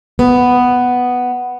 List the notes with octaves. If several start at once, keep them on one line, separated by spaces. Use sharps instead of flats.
B3